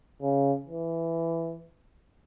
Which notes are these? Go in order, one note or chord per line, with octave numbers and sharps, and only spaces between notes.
C#3
E3